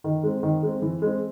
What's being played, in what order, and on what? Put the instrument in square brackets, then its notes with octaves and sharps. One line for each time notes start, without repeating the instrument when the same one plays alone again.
[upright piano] D#3
G#3 C4
D#3
G#3 C4
E3
G#3 C4